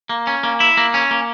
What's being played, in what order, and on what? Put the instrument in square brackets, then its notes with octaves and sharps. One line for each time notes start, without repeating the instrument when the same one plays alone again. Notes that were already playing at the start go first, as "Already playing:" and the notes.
[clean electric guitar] A#3
C#4
A#3
E4
A#3
C#4
A#3